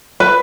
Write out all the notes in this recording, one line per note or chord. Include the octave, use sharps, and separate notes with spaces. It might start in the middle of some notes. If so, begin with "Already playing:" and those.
B4